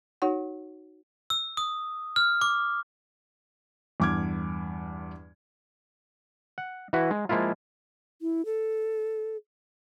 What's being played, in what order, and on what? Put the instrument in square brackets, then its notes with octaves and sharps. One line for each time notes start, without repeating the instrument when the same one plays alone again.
[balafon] D#4 F#4 C#5 F#5
[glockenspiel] E6
D#6
F6
D6
[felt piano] E2 G2 D6 F6 G#6
[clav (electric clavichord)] F#5
E3 E4 F#4 B4
G#3
F3 G#3 A#3 E4 F4
[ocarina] E4
A4